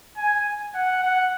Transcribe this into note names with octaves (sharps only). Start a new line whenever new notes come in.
G#5
F#5
F#5